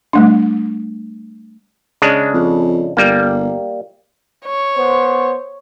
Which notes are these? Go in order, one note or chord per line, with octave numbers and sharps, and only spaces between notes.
G3 A3 D4
C#3 G#3 D4
F2
G1 G3 A#3
C#5
B3 C5